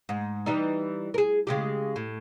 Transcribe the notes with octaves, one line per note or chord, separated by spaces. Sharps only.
G#2
E3 G3 D#4
G#4 A#4
C#3 G#3 G4
A2